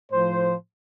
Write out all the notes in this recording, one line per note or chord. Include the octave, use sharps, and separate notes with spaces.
A2 F3 C5